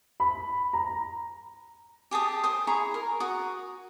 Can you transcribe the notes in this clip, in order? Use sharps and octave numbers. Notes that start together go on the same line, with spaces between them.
B5
A#5
G4 G#4 A5 D#6
C5 D#6
E4 G#4 A#5 C#6
A#4
F#4 D#6